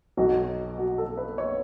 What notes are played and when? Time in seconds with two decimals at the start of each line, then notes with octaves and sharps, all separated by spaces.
0.17 B1 B2 F#3 F#4
0.78 F#4
0.98 A4
1.18 B4
1.38 C#5